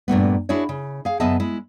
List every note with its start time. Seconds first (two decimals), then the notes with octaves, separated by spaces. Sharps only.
0.08 G2 A#2 A3 B3
0.49 D4 E4 F#4 G#4 C#5
0.69 C#3
1.05 G#4 F5
1.20 F#2 C#3 B3 D#5 E5 A5
1.40 G#3 E4